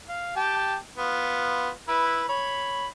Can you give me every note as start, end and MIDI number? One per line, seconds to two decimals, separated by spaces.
0.09 0.36 77
0.36 0.76 67
0.36 0.76 79
0.36 0.76 81
0.98 1.69 59
0.98 1.69 65
1.88 2.24 64
1.88 2.24 71
2.29 2.87 73
2.29 2.87 83